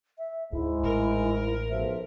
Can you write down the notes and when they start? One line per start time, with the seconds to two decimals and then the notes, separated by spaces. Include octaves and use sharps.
0.18 E5
0.52 D2 G#2 E4
0.83 A1 A3 A#4
1.70 B1 F3 C5 E5